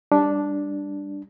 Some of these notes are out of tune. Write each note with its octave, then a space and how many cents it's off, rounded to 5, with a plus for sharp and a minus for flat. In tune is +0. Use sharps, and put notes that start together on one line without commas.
G3 +20 D4 +0